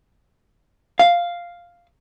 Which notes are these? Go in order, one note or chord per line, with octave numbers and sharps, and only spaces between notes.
F5